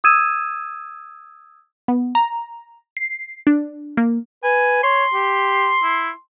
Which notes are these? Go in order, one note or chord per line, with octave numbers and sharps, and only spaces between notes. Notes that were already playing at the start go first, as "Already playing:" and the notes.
D#6 E6 G#6 D#7 E7
B3
A#5
C7
D4
A#3
B4 G#5
C#5 C6
G4
E4